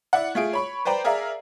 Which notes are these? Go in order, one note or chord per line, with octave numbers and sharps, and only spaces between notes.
E4 D5 F#5
A3 F4 G#4 D7
C#5 B5 C#6
B4 C5 D5 G5 A#5
G#4 A#4 D5 E5 F5